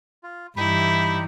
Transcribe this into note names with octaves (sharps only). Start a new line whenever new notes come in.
F4
G2 E3 D#4 E4 G4 B5